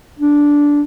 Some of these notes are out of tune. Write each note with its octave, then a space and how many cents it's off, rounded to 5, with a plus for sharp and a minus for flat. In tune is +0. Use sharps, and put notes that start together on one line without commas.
D4 -10